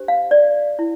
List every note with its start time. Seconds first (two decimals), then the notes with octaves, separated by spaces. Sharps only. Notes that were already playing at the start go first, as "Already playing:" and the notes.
Already playing: D4 G4 C5
0.08 F5
0.31 D5
0.79 E4